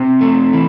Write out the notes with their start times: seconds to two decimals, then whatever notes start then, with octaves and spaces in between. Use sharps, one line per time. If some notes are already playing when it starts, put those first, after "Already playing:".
Already playing: C3
0.21 A3
0.53 E3